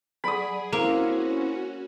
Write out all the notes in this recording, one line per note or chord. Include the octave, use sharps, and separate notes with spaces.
F#3 G#4 D5 B5 D#6
A#3 C4 C#4 E4 F#4 C5